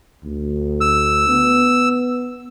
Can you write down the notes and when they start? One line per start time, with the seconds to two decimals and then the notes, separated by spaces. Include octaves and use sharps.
0.24 D2
0.81 E6
1.29 B3